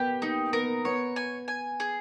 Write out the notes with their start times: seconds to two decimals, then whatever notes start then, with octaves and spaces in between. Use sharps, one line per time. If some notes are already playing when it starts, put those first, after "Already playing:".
Already playing: B3 G4 A#4 B4
0.22 A#3 D#4
0.53 B3 A#4
0.85 B3 C#5
1.16 G#5
1.48 G#5
1.80 G#4